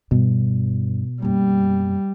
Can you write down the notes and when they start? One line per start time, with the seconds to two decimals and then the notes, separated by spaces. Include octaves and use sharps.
0.11 G2 B2
1.22 F#2 G3 A#3